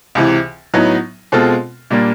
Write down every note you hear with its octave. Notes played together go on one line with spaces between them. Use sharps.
C#2 C3 E3
A2 F#3 B3 D#4
B2 G#3 C4 F4 A4
A#2 G3 A#3 D4